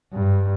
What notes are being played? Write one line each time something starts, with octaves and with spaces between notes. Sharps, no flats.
G2